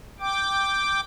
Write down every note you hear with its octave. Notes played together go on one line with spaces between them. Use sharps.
G5 D6